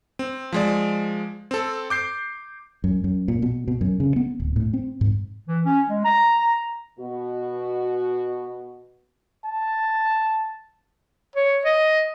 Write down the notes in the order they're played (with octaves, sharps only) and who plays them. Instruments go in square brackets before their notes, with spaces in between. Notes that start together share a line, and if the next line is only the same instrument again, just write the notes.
[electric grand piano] C4
F3 G#3 D5
C4 A4
D6 G6 C7
[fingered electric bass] F#2
F#2
A#2
B2
B2
F#2
C#3
B3
D1
A2
C4
G#2
[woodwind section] E3
C#4
G#3
A#5
[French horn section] B2 F#4
[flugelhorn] A5
[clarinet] C#5
D#5